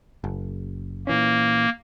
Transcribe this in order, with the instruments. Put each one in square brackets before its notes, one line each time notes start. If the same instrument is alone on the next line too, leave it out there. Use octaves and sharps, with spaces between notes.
[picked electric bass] F#1
[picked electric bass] A#2 E3 C#4 [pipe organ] A#3